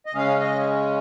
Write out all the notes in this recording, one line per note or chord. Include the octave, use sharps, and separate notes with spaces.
D#5
C#3 G#3 C#4 F5
D#5